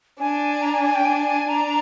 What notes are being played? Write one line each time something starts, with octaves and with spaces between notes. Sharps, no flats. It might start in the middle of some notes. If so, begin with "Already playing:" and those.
D4 G#5
A#5
G#5
G#5
G5
D4 G#5
D4 A#5